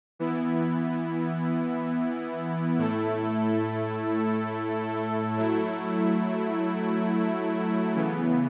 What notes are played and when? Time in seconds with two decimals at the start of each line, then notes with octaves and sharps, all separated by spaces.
0.19 E3 B3 E4
2.78 A2 A3 E4 A4
5.37 F#3 A3 E4
7.95 C#3 E3 B3